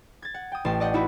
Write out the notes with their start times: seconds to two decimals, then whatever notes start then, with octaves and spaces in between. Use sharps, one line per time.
0.22 G#6 A6
0.34 F#5
0.52 G5 D#6
0.65 A1 A5 C6
0.80 D5 D#5 F#5 G6
0.93 D#4 E4 F#4 B4